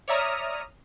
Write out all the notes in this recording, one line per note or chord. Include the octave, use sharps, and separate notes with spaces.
C#5 D5 E5 A#5 D#6 F6